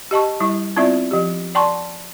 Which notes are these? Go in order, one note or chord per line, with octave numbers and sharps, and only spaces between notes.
G4 D#5 A5 C#6
G3 E4
B3 C4 E4 F4 D5 E5
F3 G4
D5 G5 A5 C6 C#6